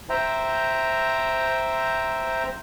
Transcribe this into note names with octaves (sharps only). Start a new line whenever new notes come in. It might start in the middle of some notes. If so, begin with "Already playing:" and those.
C5 E5 G5 A#5